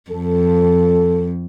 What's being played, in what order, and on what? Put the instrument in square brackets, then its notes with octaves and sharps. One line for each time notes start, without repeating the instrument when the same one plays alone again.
[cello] F2 [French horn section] A4